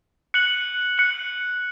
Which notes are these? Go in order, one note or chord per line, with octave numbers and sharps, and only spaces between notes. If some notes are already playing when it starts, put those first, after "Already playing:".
F#6 C#7 F#7
F#6 C#7 F#7